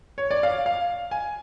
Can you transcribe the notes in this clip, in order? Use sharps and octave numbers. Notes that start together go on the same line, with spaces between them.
C#5
D5
F5
F5
G#5